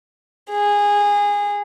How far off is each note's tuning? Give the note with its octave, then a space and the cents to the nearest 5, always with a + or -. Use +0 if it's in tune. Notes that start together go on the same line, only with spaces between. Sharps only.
G#4 -20